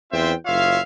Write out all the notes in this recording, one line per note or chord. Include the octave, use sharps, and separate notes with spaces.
E2 C4 F4 C5 E5 G5
F#1 F4 C#5 E5 F5